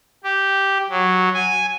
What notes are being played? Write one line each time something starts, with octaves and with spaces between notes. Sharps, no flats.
G4
F#3
G#5